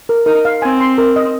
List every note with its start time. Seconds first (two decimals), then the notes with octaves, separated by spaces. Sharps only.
0.09 A#4
0.26 D#4 A#4
0.45 F5
0.62 C4 G#5
0.80 C6
0.98 A#4
1.16 D#5